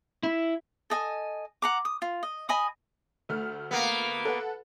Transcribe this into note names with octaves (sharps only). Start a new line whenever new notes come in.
E4
A4 D#5 G#5
F#5 A#5 D6
D#6
F4
D#5
D#5 G#5 B5 D#6
D2 A3 F6
A#3 B3
A4 B4 F#5